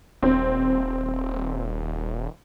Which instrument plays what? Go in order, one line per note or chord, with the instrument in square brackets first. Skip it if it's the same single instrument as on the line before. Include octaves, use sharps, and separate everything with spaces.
[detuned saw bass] D#1 [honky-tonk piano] C4